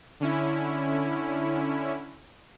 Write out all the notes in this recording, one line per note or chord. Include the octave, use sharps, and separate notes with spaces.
D3 C#4 E4